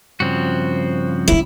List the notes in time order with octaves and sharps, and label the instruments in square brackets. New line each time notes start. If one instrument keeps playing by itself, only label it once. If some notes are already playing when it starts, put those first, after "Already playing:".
[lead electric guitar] G2 C#3 [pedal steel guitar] F3 C4 F#4
[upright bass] D#3 B3 [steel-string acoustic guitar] E4